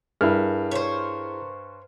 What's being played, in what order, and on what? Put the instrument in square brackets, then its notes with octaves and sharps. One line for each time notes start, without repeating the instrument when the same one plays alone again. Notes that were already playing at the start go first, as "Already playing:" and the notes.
[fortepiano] G2 [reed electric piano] E4 G#4 [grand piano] A#4 F6
[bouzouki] C5 C#5